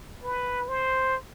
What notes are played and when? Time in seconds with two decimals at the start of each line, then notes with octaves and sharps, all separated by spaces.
0.24 B4
0.68 C5